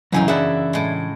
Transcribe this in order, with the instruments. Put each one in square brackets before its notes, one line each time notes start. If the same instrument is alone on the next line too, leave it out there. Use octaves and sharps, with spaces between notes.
[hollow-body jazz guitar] C2 E3 G#5 [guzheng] F#2 C#3 D#4 [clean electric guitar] F#3
[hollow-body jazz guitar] E3 D4 G#4 [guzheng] E4 F#5 [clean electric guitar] D5 E5
[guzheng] A2 G#3